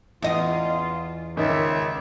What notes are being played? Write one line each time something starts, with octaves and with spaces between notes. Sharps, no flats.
E2 E3 C#4 F4 D#5
C#2 G#2 D#3 E5